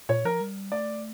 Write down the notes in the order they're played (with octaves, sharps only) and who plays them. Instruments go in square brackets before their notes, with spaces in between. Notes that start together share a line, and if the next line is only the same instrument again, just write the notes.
[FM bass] A#2 [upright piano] C#5
[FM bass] F3 [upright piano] A#4
[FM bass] G3
[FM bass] A3 [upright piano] D5